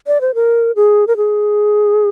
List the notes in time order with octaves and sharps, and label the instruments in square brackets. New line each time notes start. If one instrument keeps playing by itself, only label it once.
[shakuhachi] D5
C5
A#4
G#4
A#4
G#4